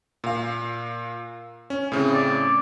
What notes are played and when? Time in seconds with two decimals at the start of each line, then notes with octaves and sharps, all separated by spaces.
0.24 A#2 F5
1.70 C#4
1.92 A2 C#3 C4
2.14 D5